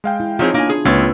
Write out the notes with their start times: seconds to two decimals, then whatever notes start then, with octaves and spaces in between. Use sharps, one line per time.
0.04 G#3 F5 G5
0.20 E4
0.39 F3 C4 D#4 F4 G#4 C#5
0.54 A#3 B3 D4 G#5
0.69 G#4
0.85 C#2 A#3 C4 F4 B4 C#5 E6